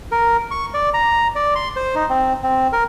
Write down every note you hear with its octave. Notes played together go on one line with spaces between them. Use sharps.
A#4
C#6
D5
A#5
D5
C6
C5
D#4
C4
C4
A#4